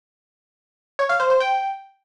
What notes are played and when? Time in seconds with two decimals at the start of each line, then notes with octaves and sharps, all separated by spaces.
0.99 C#5
1.09 F5
1.20 C5
1.30 C5
1.40 G5